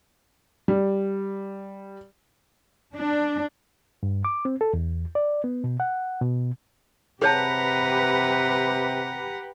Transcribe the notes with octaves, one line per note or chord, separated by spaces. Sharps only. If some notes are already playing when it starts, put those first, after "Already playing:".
G3
D4
G2
D6
C4
A4
E2
D5
B3
B2
F#5
B2
C3 G4 G#4 B4 C#5 F#5 A5 A#5